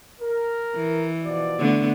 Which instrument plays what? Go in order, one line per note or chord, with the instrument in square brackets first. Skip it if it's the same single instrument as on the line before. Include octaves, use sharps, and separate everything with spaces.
[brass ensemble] A#4
[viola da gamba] E3
[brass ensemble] B2 F3 D5
[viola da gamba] D3 A3 B3